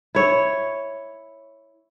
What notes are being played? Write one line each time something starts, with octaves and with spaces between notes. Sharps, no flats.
E4 C#5